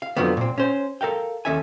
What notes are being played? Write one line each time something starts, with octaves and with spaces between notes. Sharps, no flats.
F5
F2 B2 D3 F3 F#3 B3
A#2 C4
C#4 C5
A4 A#4 F5 G5
D#2 C#4 A4 E5 G#5